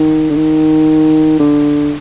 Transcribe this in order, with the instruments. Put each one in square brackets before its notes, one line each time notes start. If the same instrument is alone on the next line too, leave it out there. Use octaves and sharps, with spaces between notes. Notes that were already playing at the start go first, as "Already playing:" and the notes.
Already playing: [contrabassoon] D#3
D3
D#3
D3